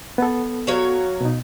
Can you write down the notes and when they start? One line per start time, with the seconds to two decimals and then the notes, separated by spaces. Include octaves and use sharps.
0.18 B3 A4
0.67 F#3 C#5 F5
1.21 B2 D#4